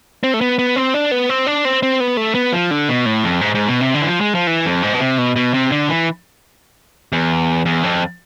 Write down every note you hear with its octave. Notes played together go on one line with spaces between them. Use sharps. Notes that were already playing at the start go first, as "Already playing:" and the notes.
C4
A3
B3
B3
C4
D4
B3
C4
D4
C4
C4
B3
A3
B3
F3
D3
B2
A2
F2
G#2
G#2
B2
C3
D3
E3
F3
G#3
F3
E3
F2
G#2
B2
C3
B2
B2
C3
D3
E3
E2
E2
F2